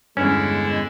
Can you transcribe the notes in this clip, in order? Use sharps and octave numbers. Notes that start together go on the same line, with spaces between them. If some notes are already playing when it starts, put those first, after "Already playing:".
E2 G2 D3 G#3 C#4 E4